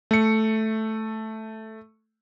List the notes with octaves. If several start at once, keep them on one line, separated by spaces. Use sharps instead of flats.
A3 C#7